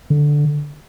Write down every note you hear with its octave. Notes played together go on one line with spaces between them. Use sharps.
D3